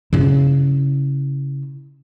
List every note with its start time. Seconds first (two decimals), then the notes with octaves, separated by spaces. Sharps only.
0.13 C#3 E4